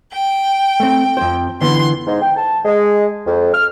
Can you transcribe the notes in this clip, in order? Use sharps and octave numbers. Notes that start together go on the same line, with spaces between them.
G5
A3 C4
F2 C5
D3 E3 B3 C6
G#2
G5
A5
G#3
F2
F6